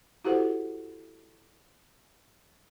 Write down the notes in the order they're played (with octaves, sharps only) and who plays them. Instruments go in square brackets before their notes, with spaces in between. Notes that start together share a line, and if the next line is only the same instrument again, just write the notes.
[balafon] E4 F#4 G4 A4 C5 F#5